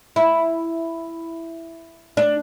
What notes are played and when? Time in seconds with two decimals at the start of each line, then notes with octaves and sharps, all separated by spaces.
0.16 E4
2.17 D4